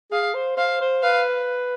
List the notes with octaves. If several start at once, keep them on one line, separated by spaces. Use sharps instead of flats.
G#4 F5
C5
C5 F5
C5
B4 F5